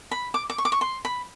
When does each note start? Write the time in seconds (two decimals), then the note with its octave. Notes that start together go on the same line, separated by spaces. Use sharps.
0.11 B5
0.34 D6
0.50 D6
0.58 C#6
0.65 D6
0.72 C#6
0.81 C6
1.05 B5